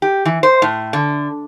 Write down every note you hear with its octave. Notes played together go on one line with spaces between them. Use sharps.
G4
E3
C5
A2
D3